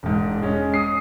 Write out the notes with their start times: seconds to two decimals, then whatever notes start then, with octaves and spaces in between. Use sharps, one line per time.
0.03 E1 G#2
0.42 G#3 C#4
0.74 D#6 C7